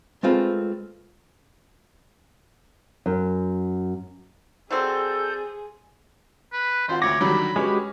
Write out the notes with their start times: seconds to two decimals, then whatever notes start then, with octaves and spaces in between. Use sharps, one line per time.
0.23 G#3 A3 C4 F4 B4
3.06 F#2
4.71 F#3 G3 C4 G#4 A4 G6
6.52 B4
6.88 G#1 F4 C5 F#5
7.02 D2 C#5 D6 A#6
7.21 D3 D#3 F#3 G3 D4 B5
7.56 G#3 C#4 F#4 G4 B4 C#5 G#5